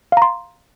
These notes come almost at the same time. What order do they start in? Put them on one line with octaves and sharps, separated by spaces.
F5 A#5 C6